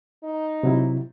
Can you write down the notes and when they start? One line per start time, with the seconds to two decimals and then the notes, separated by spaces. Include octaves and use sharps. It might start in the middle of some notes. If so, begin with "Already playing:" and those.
0.24 D#4
0.63 C3 F#3 E4